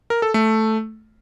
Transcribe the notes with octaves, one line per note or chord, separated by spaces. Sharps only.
A#4
A4
A3